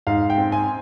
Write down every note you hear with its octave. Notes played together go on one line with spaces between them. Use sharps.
G#2 F5
G5
C4
G#5